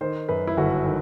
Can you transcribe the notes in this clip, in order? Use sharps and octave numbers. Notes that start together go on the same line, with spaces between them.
D#3 C5
F#2 B4
E4
G1 F#4
D#3